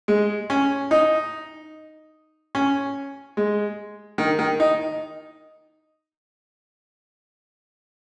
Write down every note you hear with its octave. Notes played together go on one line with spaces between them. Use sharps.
G#3
C#4
D#4
C#4
G#3
D#3
D#3
D#4